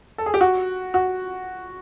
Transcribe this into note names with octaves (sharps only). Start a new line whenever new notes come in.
A4
G#4
G4
F#4
F#4